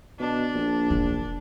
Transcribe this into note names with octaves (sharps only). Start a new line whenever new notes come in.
B2 D4
A#1
E1 F4